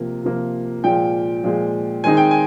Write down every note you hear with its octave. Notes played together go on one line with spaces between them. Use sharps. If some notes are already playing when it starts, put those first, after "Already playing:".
Already playing: C3 F3 A#3
C3 F3 A#3
A#2 F3 G#3 G5
A#2 F3 G#3
D#3 G#3 C4 D#4 G#5
G5
G#5